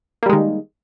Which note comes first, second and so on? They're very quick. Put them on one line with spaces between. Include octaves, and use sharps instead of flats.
A#3 G3 G#3 D#3